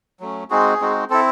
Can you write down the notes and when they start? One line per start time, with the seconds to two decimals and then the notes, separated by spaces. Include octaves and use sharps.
0.20 F#3 A3 C#4
0.50 G#3 C4 D#4 F#4 G#4
0.81 G#3 C4 D#4 F#4
1.10 C4 E4 A4